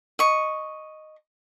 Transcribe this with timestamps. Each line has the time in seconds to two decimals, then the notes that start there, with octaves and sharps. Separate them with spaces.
0.19 D#5 C#6